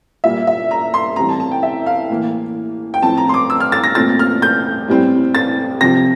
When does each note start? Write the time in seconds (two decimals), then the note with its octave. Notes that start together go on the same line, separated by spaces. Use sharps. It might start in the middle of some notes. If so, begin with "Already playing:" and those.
0.24 A#2 G3 A#3 E5
0.47 E5
0.71 A#5
0.94 C6
1.16 A2 E3 G3 C4 A#5
1.29 A5
1.40 A5
1.51 G5
1.63 E5
1.86 F5
2.10 A2 E3 A#3
2.94 G5
3.03 A2 F3 A3 C4 A5
3.18 A#5
3.29 C6
3.34 D6
3.50 E6
3.60 F6
3.72 A6
3.84 A#6
3.95 A#2 A3 C4 A6
4.19 F6
4.42 G6
4.88 A2 G3 C4
5.35 A6
5.81 C3 F3 C4 A#6